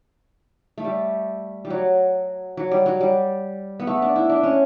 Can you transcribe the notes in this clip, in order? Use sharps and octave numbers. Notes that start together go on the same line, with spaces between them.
A3
G3
G3
F#3
F#3
G3
F#3
G3
B3
A3
D4
E4
D4
C#4